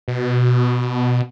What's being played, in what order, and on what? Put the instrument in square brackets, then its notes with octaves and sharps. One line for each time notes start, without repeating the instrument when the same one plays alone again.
[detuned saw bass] B2